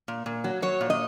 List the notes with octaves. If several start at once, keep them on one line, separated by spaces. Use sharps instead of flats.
A#2
A#2
F#3
F#3 C#5
A#2
D#5